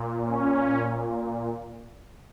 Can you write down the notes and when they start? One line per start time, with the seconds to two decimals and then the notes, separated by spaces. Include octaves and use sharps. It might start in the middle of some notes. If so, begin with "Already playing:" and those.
Already playing: A#2
0.26 C#4